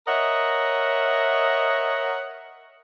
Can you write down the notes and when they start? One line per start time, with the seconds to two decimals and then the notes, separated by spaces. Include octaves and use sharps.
0.07 A#4 C#5 D#5 E5 F#5